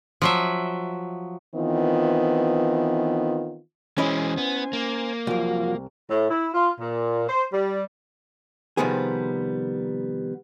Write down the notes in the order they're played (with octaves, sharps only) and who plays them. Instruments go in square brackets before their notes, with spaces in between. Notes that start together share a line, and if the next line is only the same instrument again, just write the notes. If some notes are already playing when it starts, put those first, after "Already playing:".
[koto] F3 F#3 E5
[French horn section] D#3 E3 B3 C4 F4
[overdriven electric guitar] E3 G#3 [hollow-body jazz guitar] C#4 E4 D#5 [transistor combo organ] C5 G#5
[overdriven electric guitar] B3
A#3
[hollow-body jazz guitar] C2 A#4 [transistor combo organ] F3 F#3 F4
[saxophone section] A2
E4
F4
A#2
C5
G3
[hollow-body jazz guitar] C3 D#3 F3 G3 B3 G#4